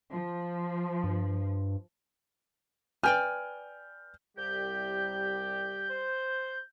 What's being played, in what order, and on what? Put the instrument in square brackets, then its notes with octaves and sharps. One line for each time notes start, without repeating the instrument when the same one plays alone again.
[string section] F3
[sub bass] G2
[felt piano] B4 F6 G6 [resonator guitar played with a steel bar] D5 G5 G#5
[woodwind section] C2 G4 [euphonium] G3 [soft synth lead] G6
[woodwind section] C5